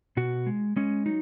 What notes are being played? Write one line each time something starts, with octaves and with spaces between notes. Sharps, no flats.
B2 F#4
G#3
G#3 C#4
F#3 D#4